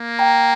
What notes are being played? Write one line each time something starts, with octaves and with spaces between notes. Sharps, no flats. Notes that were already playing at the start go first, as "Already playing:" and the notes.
Already playing: A#3
G5 A#5